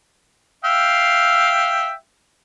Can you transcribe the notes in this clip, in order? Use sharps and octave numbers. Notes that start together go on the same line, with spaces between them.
E5 F5 G5